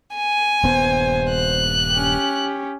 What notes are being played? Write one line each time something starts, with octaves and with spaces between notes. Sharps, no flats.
G#5
D#1 G2 B3 C5
F#6
C#4 G4